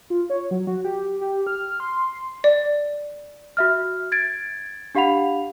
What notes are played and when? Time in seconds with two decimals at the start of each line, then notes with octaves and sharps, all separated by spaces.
0.10 F4
0.30 C#5
0.51 F#3
0.67 F#4
0.84 G4
1.21 G4
1.47 F6
1.80 C6
2.44 D5
3.57 F#4 E5 F6
4.12 G#6 A6 D7
4.95 D4 G4 F5 F#5 B5 F7